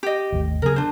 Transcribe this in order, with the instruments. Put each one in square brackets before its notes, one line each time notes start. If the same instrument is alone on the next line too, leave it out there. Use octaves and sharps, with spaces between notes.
[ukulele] G4 D#5
[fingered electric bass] G#1 D#2 A3
[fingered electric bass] C#3 F#3 B3 [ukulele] G#4 A#4
[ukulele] D4 C5